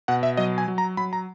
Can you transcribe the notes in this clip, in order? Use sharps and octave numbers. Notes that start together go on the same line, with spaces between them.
B2 F#5
E5
F#3 D#5
G#5
F#3
A#5
F#3 B5
A#5